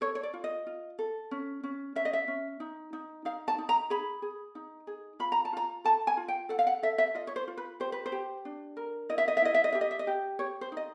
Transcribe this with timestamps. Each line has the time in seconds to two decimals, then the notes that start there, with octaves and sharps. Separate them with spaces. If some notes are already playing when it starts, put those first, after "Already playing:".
0.01 A4 C#5
0.15 C#5
0.23 D5
0.34 F4
0.44 D#5
0.67 F4
0.99 A4
1.31 C#4
1.63 C#4
1.96 C#4 E5
2.05 D#5
2.13 E5
2.28 C#4
2.60 D#4
2.93 D#4
3.25 D#4 F5
3.48 A5
3.58 D#4
3.69 A#5
3.90 G#4 B5
4.22 G#4
4.55 D#4
4.87 G#4
5.20 F4 B5
5.32 A#5
5.45 A5
5.53 F4 A#5
5.84 A4 A5
6.07 G#5
6.17 F4
6.28 G5
6.49 A4 F#5
6.59 F5
6.67 F#5
6.83 A4 E5
6.98 E5
7.15 F4 D#5
7.27 C#5
7.36 C5
7.48 F4
7.57 B4
7.80 G4 C5
7.92 B4
8.06 C5
8.12 G4
8.45 D4
8.77 A#4
9.09 E4 D#5
9.18 E5
9.28 D#5
9.37 E5
9.42 E4 D#5
9.54 E5
9.64 D#5
9.72 G4 E5
9.81 D#5
9.91 E5
9.99 D#5
10.07 G4
10.39 G4 C#5
10.61 C5
10.72 D#4 D#5